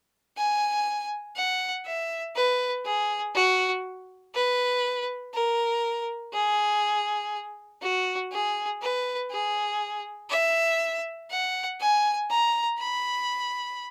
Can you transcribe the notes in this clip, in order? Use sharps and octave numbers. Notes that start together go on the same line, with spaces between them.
G#5
F#5
E5
B4
G#4
F#4
B4
A#4
G#4
F#4
G#4
B4
G#4
E5
F#5
G#5
A#5
B5